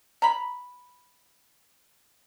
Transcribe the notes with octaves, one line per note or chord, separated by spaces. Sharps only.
A#5 B5